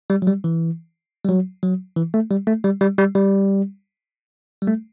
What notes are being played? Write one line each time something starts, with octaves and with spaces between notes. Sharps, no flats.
G3
F#3
G3
E3
G3
F#3
F#3
E3
A3
G3
A3
G3
G3
G3
G3
G3
A3